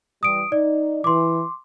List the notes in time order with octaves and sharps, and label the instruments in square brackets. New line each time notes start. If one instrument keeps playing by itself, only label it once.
[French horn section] E3 G3 [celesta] D#6 D7
[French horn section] D#4 [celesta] D5
[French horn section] E3 [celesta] C6 D6